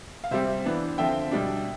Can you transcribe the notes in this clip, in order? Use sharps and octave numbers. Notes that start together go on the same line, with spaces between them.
F5
C3 G3 C4 C5 E5
E3 B3 D4
D3 F3 C4 E5 G5
B2 G3 D4